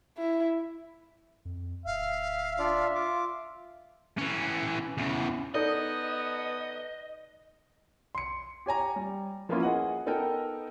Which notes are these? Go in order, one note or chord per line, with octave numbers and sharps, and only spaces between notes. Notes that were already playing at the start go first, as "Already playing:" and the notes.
E4
F2
D1 E5 F5
D4 F4 D5
F4 D6
E3 C#4
E2 C#3
B3 D#4 A4 D5 D#5
C6 C#7
G4 C#5 G#5 A#5
G3
F3 A#3 B3 C#4 E4 F4
G#4 D#5 F#5
B3 D#4 A4 A#4 D#5 G5